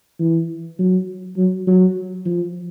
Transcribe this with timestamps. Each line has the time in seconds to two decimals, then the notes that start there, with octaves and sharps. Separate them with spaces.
0.20 E3
0.79 F#3
1.37 F#3
1.67 F#3
2.26 F3